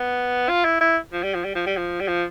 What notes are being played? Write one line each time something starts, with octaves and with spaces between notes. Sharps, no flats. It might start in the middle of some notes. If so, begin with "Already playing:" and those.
Already playing: B3
F4
E4
E4
F3
G3
F3
G3
F3
G3
F3
G3
F3